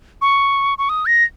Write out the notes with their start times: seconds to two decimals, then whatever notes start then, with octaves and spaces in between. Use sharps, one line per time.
0.22 C#6
0.78 C#6
0.89 D#6
1.06 A#6